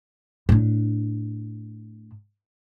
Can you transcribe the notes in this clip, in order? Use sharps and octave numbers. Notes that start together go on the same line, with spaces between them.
A2 D4